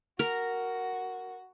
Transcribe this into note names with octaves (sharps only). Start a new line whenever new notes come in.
F#4 A#4